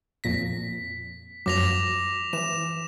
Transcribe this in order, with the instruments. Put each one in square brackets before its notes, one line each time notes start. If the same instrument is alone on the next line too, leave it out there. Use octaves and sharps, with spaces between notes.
[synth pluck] F2 A#2 A#6 [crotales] B6
[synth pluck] F#2 F3 F#3 [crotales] D6 A#6 F7
[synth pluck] E3 [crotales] E7